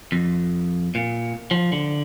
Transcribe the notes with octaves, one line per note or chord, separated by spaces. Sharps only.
F2
A#2
F3
D3